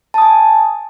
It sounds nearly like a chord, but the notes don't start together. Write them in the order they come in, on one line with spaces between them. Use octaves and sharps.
A5 D#6 G#5